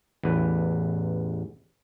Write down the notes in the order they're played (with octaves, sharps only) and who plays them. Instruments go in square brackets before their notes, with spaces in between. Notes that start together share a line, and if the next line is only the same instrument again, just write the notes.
[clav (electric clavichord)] A1 E2 B4